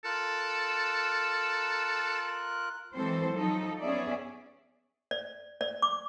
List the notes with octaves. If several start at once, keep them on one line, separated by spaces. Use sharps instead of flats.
F4 A4 A#4 F#6
E3 F#3 G#3 C4 A4 C5
F3 F#3 D#4 A4
B3 C#4 G#4 D5 E5
D5
D5
D6